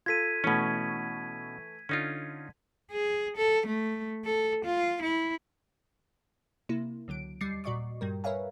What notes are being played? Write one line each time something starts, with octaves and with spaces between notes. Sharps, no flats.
F4 A4 G#6 B6 D#7
B2 E3 A3 C#4
D3 C#4 D#4 F4
G#4
A4
A3
A4
F4
E4
C3 A#3 E4
C#2 D3 F#3 D7
D#2 G3 D6 A6 C7 C#7
A#2 F#4 D5 D#5 C#6 D6
G2 G3 A#4
A#4 B4 C#5 E5 F5 G#5